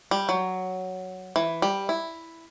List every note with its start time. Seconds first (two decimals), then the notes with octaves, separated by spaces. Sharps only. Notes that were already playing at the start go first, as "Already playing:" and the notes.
0.11 G3
0.29 F#3
1.36 E3
1.62 G3
1.89 E4